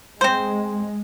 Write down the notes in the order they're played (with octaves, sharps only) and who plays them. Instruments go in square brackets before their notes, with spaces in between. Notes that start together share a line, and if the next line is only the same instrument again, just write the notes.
[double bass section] G#3 [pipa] C4 C5